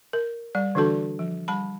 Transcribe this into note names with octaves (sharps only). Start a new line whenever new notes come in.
A#4
G3 D5
D3 E3 D4 F#4 A4 A5
F3
G3 A5 B5